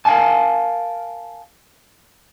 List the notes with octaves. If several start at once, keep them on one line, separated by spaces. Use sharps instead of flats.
A#4 F5 F#5 G#5 A5